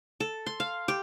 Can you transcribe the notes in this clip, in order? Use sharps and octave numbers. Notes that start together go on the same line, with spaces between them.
A4
C6
F5
G4